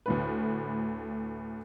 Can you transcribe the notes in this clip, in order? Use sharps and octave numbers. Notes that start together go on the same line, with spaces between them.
D2 A2 B4